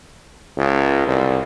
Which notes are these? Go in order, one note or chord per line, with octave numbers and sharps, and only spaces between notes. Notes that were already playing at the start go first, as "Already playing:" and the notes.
C#2
C2